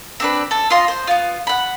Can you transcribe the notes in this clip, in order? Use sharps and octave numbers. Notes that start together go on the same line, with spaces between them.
C4 D4 B4
A4
F4 D#5 C6
C5
B3 F4
F#5 B5